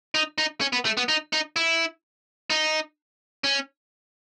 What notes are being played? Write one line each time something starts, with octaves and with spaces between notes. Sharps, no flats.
D#4
D#4
C#4
B3
A3
B3
D#4
D#4
E4
D#4
C#4